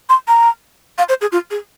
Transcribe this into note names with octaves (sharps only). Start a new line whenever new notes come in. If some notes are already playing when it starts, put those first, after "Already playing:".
C6
A#5
F5
C5
G#4
F4
G#4